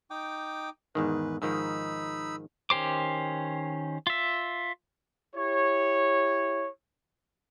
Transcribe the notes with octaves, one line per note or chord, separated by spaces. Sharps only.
D#4 G5 D6
E2 G#2 D#3 B4
G#2 D#3 F3 D#4 B5 E6
D#3 C#4 G4 C5 D6
F4 E5
E4 G4 C#5